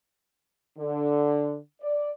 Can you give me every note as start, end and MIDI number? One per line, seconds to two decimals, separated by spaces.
0.77 1.56 50
1.81 2.11 74